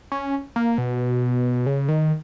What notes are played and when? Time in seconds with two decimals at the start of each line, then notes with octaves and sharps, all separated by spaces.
0.12 C#4
0.56 A#3
0.78 B2
1.66 C#3
1.88 D#3